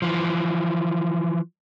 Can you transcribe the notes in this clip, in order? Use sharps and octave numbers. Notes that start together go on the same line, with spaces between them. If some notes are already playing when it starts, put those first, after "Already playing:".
E3 F3